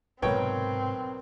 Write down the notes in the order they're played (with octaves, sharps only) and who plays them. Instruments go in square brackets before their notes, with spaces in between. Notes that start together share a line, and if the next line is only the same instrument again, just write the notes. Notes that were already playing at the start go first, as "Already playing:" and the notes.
[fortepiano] B1 C#5 G5 [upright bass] G#2 C3 [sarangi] C4 [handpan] A#4 B4